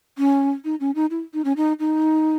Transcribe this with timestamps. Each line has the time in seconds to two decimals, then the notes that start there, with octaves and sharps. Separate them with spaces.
0.18 C#4
0.65 D#4
0.80 C#4
0.95 D#4
1.11 E4
1.34 D#4
1.45 C#4
1.57 D#4
1.80 D#4